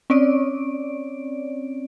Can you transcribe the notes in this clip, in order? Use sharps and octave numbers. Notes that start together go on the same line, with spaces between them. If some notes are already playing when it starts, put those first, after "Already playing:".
C4 C#4 C#5 D5 D7